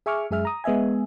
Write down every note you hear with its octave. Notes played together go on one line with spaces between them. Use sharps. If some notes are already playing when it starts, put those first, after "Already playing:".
G#4 E5 G#5 C#6 D6 F6
F#2 G#3 G#4 E5 F6
A#5 D#6
G#3 B3 D#5 E5 G#5